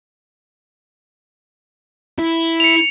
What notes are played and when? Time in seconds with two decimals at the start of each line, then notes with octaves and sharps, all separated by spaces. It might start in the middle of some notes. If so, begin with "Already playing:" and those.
2.19 E4
2.60 C#7 F7